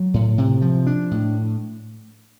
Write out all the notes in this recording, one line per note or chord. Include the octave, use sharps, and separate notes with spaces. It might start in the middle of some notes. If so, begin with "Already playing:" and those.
Already playing: F#3
A2
C3
F3
D4
A2